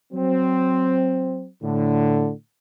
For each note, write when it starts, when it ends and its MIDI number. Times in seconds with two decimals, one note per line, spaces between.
0.12 1.46 54
0.12 1.46 60
1.63 2.30 45
1.63 2.30 50